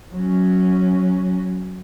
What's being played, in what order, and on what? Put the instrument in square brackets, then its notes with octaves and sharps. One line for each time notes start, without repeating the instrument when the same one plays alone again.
[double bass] F#3 C#4